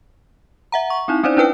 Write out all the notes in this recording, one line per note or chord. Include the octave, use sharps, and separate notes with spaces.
E5 F#5 A#5
C#6
C4 D#4 E4
C4 C#4 D#4 C5 D5
D4 E4 B4 G5